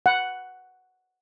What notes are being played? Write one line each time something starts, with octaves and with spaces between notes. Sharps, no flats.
F#5